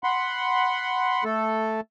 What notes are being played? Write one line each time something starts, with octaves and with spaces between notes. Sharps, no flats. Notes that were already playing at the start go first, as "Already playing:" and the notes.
F#5 B5 C6
A3 A4